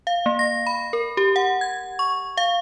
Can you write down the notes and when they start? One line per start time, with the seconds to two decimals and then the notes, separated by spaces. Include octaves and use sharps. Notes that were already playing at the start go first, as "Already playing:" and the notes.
0.07 F5
0.26 A#3
0.39 A#6
0.67 B5
0.93 A#4
1.17 G4
1.36 F#5
1.61 G#6
1.99 C#6
2.37 F5